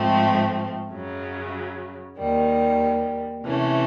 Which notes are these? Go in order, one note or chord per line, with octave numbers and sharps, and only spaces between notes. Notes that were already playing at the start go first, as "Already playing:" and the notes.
Already playing: G#2 F3 A3 C4
F#2 C#3 F#3
D#2 D#3 G3
C3 E3 A3 C#4